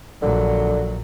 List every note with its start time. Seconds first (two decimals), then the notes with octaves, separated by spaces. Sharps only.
0.22 A#1 D3 F#3